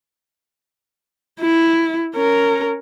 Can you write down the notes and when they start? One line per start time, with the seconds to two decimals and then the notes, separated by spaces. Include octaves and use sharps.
1.41 E4
2.15 C#4 A#4